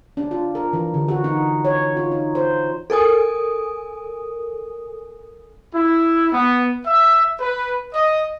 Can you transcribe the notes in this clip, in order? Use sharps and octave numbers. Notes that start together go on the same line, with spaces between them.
D4
F4
A#4
E3
D3
F#4
D#4
C#5
F4
D#4
C5
A4 A#4 G#5 D#6
E4
B3
E5
B4
D#5